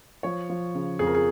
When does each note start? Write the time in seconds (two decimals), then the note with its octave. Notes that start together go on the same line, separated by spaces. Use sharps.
0.23 F3 C#5
0.50 F3
0.75 C#3
0.99 F2 G#4
1.07 A#4
1.15 G#4